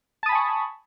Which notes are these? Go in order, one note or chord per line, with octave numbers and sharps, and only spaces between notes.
G#5 A5 B5 C#6 D#6